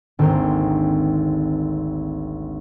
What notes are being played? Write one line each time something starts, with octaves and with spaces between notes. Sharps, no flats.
G#1 D2 A#3 C4 C5 A#5